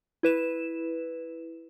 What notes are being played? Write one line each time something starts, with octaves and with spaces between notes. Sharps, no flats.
E4 B4 E7